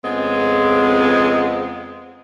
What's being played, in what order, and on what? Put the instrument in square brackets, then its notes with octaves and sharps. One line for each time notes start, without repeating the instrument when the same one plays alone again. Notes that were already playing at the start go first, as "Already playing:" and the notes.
[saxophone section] F2 C#3 G#3 B3 C4